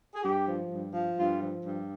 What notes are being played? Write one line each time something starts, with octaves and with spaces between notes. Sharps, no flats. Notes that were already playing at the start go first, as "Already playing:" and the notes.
G#4
G2 G4
F3
G2
F3
G2 F4
F3
G2